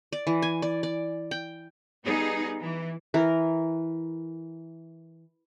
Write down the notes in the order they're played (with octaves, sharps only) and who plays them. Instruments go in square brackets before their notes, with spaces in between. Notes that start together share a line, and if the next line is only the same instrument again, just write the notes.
[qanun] D5
E3
G#5
D5
D5
G5
[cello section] G3 B3 D#4 G#4
E3
[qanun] E3 A#4